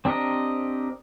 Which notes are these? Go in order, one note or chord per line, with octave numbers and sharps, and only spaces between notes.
C4 D4 G4 A#4 D#5